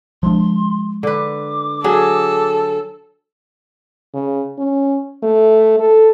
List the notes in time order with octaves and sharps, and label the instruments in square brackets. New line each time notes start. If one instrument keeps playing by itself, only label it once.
[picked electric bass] F3 G#3 D4 [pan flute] C6
[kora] D3 B4 [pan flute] D6
[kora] F#3 G#4 [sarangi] A4
[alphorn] C#3
C#4
A3
A4